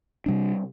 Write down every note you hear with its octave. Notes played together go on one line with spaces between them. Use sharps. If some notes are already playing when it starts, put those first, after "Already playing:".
C3 G3 D4